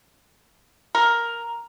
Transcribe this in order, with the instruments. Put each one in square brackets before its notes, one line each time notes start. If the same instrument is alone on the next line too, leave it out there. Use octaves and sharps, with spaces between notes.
[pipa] A#4